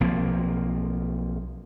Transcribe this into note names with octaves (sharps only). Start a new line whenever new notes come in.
B1 F3 A#3 C4